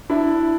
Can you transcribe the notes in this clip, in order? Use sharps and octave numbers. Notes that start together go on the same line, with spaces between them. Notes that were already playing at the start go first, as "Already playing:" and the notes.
D4 E4